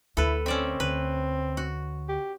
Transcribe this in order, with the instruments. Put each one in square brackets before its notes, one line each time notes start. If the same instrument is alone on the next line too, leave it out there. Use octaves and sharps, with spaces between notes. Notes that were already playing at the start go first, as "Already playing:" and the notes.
[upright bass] D2 [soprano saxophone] E4 [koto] A4 B4
[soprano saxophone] C4 [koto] C#4 D5 E5
[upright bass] D2 [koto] B4
[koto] F#4
[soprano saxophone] G4